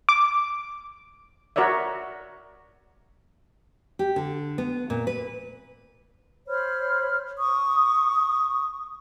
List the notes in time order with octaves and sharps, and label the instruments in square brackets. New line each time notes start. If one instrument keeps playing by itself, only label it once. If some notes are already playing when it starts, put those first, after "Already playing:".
[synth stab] D6
[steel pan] F#4 A#4 C#5 D5 E5
[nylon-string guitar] G4
D3
B3
A#2
B4
[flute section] C5 C#5 B5 F6
C#6 D#6